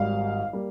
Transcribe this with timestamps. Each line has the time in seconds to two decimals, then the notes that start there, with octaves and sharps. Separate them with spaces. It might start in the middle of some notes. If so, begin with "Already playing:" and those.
Already playing: G#1 G#2 G3 F5
0.53 G3 A#3